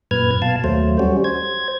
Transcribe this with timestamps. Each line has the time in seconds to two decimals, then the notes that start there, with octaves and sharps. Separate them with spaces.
0.11 F#2 A#2 B4 F6 G#6
0.42 B2 F5 A5
0.64 D#2 F#3 A3 C5
0.99 G3 C#4 F#4
1.24 C5 G#6